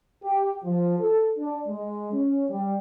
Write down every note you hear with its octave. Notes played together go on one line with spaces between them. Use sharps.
G4
F3
A4
D4
G#3
C#4
G3